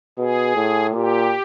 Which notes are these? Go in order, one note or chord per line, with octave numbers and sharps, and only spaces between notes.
B2 G#4
A2
A#2 G4